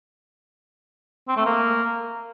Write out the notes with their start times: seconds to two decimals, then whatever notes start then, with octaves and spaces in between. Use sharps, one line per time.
1.28 C4
1.36 A3
1.45 A#3